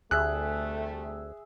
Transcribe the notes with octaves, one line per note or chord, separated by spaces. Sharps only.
D2 C3 G3 A3 G#4 E5 F#6